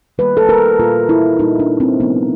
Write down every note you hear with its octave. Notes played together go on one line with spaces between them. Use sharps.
D#3 G3 A#3 B4
A4
A#4
A#2 G3 A#3 F4
E4
A#2 G3 A#3 D#4
D4
C4
C3 F3 A3 B3